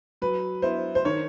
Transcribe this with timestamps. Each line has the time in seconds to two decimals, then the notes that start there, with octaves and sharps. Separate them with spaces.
0.22 F#3 B4
0.62 B3 E4 C5
0.95 C5
1.05 D#3 C#5